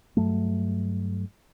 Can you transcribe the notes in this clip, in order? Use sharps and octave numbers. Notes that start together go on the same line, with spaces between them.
G2 F#3 A3